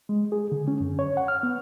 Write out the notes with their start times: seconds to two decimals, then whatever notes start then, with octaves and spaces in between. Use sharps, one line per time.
0.09 G#3
0.32 G#4
0.52 D3
0.68 C#4
0.81 F#2
0.99 C#5
1.17 F#5
1.28 F6
1.43 B3